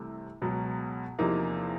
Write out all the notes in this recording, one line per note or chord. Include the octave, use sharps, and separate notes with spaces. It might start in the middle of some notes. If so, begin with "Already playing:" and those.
Already playing: C2 C3 E3 A3
C#2 B2 F#3
E2 C3 F3 A#3 D#4